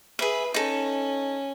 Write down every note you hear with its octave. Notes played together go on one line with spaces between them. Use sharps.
G#4 B4 E5
C#4 D#4 A4